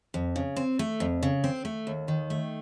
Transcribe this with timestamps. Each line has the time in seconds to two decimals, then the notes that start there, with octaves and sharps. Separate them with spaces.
0.14 F2
0.36 C#3
0.56 C4
0.79 A3
1.00 F2
1.23 C#3
1.44 C4
1.65 A3
1.87 D#2
2.08 D#3
2.30 A3